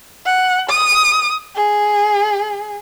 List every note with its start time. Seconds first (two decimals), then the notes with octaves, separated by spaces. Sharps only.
0.26 F#5
0.70 D#6
1.56 G#4